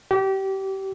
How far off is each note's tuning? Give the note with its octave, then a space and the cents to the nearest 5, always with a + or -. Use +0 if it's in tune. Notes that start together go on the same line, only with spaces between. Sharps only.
G4 -25